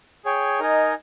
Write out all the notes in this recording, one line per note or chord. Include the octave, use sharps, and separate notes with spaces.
G#4 C#5 G5
D#4 A#4 D#5 G#5